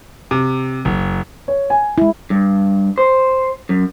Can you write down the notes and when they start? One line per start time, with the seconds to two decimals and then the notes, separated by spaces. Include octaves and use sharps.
0.31 C3
0.85 F#1
1.48 C#5
1.70 G#5
1.98 G#3 E4
2.30 G2
2.98 C5
3.69 F#2